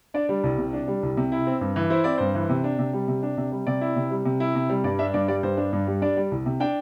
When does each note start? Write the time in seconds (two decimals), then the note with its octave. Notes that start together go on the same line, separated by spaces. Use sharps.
0.14 D4 D5
0.29 G3
0.44 C2
0.58 C3
0.73 D4
0.88 G3
1.03 C2
1.17 C3
1.32 E4
1.47 C4
1.61 G2
1.76 E3
1.90 E4 C5
2.04 C4 D5
2.18 G2 C5
2.35 E3
2.49 C3
2.64 D4
2.79 C3
2.93 G3
3.08 C3
3.23 D4
3.37 C3
3.52 G3
3.67 C3 D5
3.81 E4
3.96 C3
4.11 G3
4.25 C3
4.40 E4
4.55 C3
4.70 G3
4.84 G2 D5
4.99 D4 E5
5.14 G2 D5
5.28 G3 D5
5.43 G2 C5
5.57 D4
5.73 G2
5.87 G3
6.02 D4 D5
6.16 G3
6.31 C2
6.46 C3
6.60 D4 G5